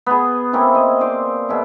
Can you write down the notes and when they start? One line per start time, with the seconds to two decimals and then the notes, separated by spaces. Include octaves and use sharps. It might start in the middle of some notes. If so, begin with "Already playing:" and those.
0.06 B3 G#4
0.53 A#3 C4 C#4 E4
0.75 D#5
1.01 C5 D5 F5
1.49 B2 G#4 E5